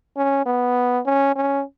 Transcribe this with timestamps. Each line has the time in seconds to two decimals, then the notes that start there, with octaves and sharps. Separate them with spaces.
0.17 C#4
0.46 B3
1.06 C#4
1.36 C#4